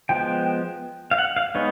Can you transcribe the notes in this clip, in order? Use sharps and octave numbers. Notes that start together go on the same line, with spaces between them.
F3 G#3 B3 G5
F5
F#5
F5
G#3 B3 D#4 C#5